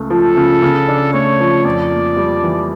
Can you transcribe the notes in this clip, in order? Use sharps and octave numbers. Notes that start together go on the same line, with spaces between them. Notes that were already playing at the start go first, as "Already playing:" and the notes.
Already playing: C#2 A3
F3 A4
C#3
C#3
D4
A3 C#5
F3
F2 D5
A#3
G3
E3